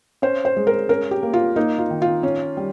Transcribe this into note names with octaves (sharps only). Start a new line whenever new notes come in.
C#4 C5
C5
G#3
A#4
C#4 A#4
G4
A#3
F4
A#3 D#4
F4
D#3
F4
C#4
G3